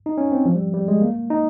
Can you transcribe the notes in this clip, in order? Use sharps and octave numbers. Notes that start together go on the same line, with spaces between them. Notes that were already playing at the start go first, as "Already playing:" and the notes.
D#4
C#4
C4
F3
G3
G3
G#3
A#3
D#4